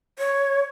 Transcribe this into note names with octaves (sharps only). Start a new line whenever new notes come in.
C#5